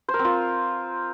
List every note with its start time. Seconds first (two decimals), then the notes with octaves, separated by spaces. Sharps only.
0.09 C5
0.14 A#4
0.19 C4
0.25 F4